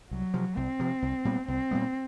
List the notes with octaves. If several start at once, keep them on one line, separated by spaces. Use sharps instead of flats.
C2 F#3
C3 F3
C2 C4
C3 F3
C2
A#2 G3 B3
C2 C4
A#2 G3 B3